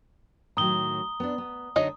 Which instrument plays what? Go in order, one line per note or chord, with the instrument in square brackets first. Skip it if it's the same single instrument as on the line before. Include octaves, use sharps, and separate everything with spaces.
[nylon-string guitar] A2 D#3 F#3 [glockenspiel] A#5 D#6 G7
[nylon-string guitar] B3 D4
B3
[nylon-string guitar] D3 G#3 [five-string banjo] F#3 D#4 D#5